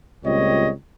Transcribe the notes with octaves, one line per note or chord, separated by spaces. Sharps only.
C#2 A#2 G3 C4 C#5 D#5